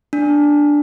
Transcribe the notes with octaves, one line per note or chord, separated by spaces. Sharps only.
D4